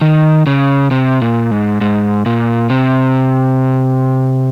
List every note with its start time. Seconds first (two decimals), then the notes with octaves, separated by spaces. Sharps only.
0.01 D#3
0.47 C#3
0.91 C3
1.22 A#2
1.51 G#2
1.81 G#2
2.26 A#2
2.70 C3